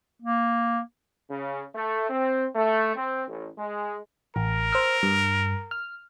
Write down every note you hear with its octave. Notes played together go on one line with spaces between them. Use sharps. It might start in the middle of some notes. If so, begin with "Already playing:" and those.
A#3
C#3
A3
C4
A3
C4
A1
G#3
A1 A#4
C5 E6 F6
G2
F6